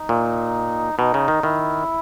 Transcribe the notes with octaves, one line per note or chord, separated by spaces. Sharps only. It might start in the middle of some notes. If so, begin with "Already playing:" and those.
Already playing: D#4
A#2
B2 D#4
C#3
D#3
D#3 E4